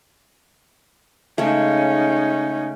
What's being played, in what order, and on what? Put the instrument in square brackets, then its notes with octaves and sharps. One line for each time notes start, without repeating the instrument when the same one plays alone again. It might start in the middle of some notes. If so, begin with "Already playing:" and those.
[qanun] C#3 G#3 A3 [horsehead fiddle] C#4 D#4